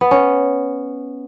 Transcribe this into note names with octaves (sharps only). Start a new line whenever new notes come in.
B3
C#4